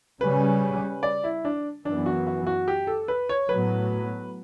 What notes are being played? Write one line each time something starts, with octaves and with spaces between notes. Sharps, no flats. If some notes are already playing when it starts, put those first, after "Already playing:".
C#3 G3 C#4 B4
D5
E4
D4
F#2 E3 B3 D4
F#4
F#4
F#4
G4
A4
B4
C#5
A2 F#3 B3 B4